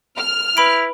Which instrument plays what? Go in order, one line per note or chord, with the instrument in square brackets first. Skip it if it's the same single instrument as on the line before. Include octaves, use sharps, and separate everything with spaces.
[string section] F6
[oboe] E4 [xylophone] B4 B5 D7